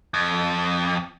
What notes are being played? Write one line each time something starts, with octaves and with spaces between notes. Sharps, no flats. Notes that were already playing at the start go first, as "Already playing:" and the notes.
F2